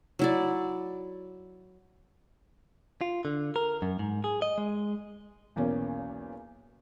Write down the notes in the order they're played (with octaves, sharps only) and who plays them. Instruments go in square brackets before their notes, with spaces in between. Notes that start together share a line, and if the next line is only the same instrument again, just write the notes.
[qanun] F#3 E4 D5
[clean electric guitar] F4
D3
A#4
F#2
G#2
G#4
D#5
G#3
[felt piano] B1 E2 A#3 C#4